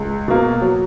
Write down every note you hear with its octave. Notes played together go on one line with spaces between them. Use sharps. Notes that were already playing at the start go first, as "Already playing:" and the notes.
Already playing: C#2
B2 A#3
F#3